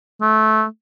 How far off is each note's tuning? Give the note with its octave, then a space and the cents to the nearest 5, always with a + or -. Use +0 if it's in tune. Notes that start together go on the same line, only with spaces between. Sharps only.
A3 -20